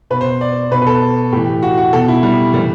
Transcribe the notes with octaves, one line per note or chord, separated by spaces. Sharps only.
B2 B4
C5
D5
B2 B4
B4
A4
A2 E3 G4
F#4
F#4
B2 A4
E4
G3
A2 E3 G3